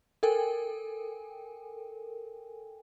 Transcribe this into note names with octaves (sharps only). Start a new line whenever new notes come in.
A4 A#4 G5 G#5